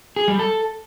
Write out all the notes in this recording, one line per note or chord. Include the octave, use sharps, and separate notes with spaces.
G#4
G3
A4